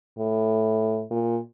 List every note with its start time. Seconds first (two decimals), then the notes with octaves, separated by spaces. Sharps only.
0.18 A2
1.11 A#2